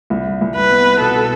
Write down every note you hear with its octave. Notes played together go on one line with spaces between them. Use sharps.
C2
C2
B4
B3
B2 A4